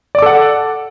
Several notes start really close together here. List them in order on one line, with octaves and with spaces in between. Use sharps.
D5 D6 A4 F#5